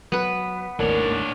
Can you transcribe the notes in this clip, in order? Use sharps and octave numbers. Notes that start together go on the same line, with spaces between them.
F#3 B3 B4
G#1 D#2 A2 D4 A#4 C#5